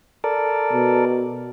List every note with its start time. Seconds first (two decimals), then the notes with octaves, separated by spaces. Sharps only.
0.24 A4 A#4 D5
0.73 B2